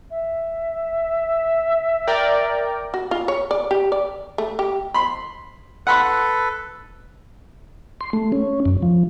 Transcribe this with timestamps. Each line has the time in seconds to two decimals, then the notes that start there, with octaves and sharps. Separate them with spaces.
0.11 E5
2.07 A#4 D5 G5
2.94 F#4
3.11 F4
3.28 C#5
3.51 D5
3.71 G4
3.92 D5
4.38 A3
4.59 G4
4.94 B5 C6
5.87 A4 B4 F#5 B5 C6
8.01 C6
8.13 A3
8.32 C#4
8.65 F#2
8.82 F3